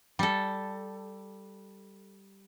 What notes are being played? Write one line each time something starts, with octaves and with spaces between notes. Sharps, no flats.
G3 A4